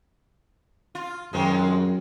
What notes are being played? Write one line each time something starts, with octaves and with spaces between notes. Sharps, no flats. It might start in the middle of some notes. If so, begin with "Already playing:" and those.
F4
F#2 D#3 F3 G#3